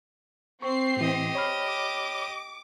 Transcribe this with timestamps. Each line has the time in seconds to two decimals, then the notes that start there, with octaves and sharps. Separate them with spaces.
0.62 C4 C#6 C7
0.97 A2 E3 G4 D#5
1.35 C#5 B5 F6
1.68 D6